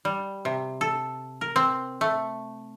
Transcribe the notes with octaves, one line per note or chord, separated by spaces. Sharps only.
G3
C3
A4
A#4
C4
A3